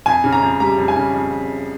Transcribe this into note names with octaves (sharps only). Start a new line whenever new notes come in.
F2 G#5
C#3
A#5
F2
G3 A#5
F2
G#5
C#3
F2